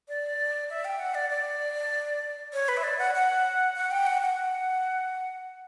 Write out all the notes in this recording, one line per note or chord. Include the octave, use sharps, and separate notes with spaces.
D5
E5
G5
F#5
D5
D5
C#5
B4
E5
D5
F#5
F#5
F#5
G5
F#5
F#5